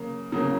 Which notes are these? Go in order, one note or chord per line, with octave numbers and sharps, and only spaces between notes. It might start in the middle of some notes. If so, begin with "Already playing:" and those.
Already playing: C#3 F#3 A#3
C#3 F#3 A#3